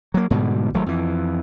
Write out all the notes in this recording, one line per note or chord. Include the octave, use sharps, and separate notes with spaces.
F#3 A#3
G#2 B2 D3 G3
G#1 F#3 A3
F2 E3